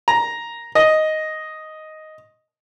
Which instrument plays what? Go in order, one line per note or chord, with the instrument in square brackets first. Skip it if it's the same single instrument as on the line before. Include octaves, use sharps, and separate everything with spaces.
[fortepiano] A#5
D#5